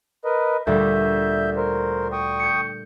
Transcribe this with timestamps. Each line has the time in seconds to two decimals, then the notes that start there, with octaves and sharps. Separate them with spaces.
0.25 A#4 B4 D#5
0.67 D2 A#2 G3 E5 G6
1.57 A#4 C5
2.12 G5 C#6 D#6
2.40 G6 C#7